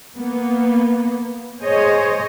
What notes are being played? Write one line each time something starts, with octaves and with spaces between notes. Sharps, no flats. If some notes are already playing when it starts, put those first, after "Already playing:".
A#3 B3
G#4 C5 C#5 D#5